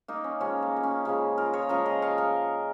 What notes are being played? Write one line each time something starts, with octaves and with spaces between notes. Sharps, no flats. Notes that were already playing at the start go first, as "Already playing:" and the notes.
A#3 D#4
C#4
C#3 F3 G#3 C#4
A#3
A#3
C#4
C#3 F3 G#3 C#4
F4 A#4
G#4 C#5
C#3 F3 G#3 A#4 D#5
A#4 D#5
C#5 F5
A#4 D#5